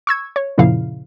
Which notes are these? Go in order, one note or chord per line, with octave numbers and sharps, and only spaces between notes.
C#6 E6 G#6
C#5
F#2 A#2 C#3 F3 E4 F5